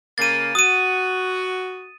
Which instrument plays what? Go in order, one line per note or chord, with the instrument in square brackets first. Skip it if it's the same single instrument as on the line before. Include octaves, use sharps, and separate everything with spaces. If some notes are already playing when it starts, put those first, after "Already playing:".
[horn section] C#3 A#3 [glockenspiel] A6 D#7
[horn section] F#4 [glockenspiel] D#6 D#7